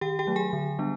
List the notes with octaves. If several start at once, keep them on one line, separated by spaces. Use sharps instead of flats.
D#3 G4 G5
G4 G5
F#3 A3
G#4 G#5
D3
G3 B3 D4